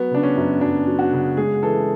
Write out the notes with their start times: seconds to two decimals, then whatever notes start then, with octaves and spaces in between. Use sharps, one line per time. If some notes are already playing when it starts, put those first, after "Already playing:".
Already playing: F#3 B3
0.11 C#3 D4
0.23 C#4
0.37 F#2
0.61 F#2 D4
0.87 F#3
0.99 F#4
1.12 C#3
1.37 G#3 G#4
1.63 E3 A4